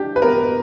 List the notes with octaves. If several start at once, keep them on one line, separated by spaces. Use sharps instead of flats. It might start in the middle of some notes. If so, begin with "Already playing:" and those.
Already playing: D4 G4
B4
B3 A#4